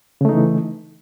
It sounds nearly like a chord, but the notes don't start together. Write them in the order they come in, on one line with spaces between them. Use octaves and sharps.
C#3 A3 D#4 E3